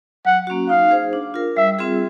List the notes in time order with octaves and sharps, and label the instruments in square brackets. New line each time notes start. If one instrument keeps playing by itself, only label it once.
[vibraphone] F#3 [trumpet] F#5
[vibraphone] A#3 C#4 F#4
[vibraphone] D#4 [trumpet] F5
[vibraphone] G#4 C5
D4
F4 A#4
[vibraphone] G3 [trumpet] E5
[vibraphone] C4 F4 G#4